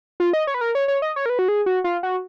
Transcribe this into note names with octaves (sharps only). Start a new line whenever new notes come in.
F4
D#5
C#5
B4
A#4
C#5
C#5
D#5
C#5
A#4
B4
F#4
G#4
F#4
F4
F#4